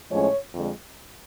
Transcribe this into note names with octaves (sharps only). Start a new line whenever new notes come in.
A2 F3 G#3 C#4 C#5
F2 D3 G#3